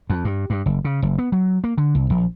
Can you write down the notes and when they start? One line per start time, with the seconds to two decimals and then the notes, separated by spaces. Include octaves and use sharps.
0.10 F2
0.25 G2
0.50 G2
0.66 F#1
0.85 C#3
1.02 F#1
1.18 B3
1.32 F#3
1.64 A#3
1.78 D3
1.95 C2
2.10 A#1